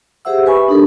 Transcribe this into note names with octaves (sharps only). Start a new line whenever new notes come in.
G4 G#4 C5 E5 F#5 E6
G4 B4 E5 G#5 B5 C#6
D4 D#4 G4 A4 A#4